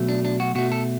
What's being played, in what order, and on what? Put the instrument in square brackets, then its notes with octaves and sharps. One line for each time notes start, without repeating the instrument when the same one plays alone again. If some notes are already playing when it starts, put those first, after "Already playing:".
Already playing: [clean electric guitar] B2 F#3 A3
D4
D4
F#4
B2 A3 F#4
A4